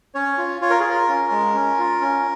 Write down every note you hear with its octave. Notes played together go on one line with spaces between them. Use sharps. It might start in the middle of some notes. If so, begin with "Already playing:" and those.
C#4 C#5
F4
F4 C#5
A#4
G#4
F4
A#4
C#4
G#3
C#4
F4
C#4